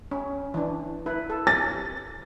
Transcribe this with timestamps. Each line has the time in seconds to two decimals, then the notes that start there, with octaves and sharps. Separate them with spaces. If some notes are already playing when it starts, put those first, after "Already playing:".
0.11 C#4
0.54 E3 D4
1.06 E4 B4
1.30 A4
1.47 A6